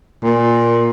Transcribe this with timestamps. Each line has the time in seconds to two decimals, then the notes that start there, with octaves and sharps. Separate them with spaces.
0.23 A#2